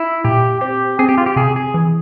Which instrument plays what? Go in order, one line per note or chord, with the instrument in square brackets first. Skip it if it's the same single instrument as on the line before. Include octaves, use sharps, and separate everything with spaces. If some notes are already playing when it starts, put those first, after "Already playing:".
Already playing: [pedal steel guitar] E4
[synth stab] A#2 [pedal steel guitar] G4
[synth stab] C4 [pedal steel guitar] G4
[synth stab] C4 [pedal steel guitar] G#4
[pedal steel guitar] G4
F4
G4
[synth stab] C3 [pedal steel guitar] G#4
[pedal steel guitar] G#4
[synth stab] E3